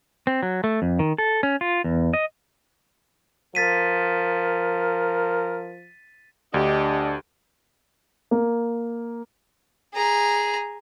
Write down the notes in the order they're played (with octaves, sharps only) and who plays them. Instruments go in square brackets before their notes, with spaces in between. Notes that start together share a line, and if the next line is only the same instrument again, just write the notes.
[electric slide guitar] C4
F#3
A3
F2
D#3
A4
C#4
F4
E2
D#5
[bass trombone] F3 [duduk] A#4 [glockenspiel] A6 B6 D#7
[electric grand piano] D2 [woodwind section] D4 D#5 [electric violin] G4
[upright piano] A#3
[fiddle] G#4 A#5